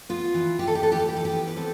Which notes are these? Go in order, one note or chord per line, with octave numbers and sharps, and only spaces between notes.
B3 F4
E3
E3 G4
A4
G4
E3 A4
G4
A4
E3 G4
A4
G4
B3
B4
C4 A4